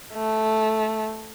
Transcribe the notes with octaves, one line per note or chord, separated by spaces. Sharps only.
A3